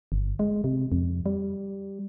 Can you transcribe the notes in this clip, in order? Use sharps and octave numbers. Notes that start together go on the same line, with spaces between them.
G1
G#3
C3
F2
G3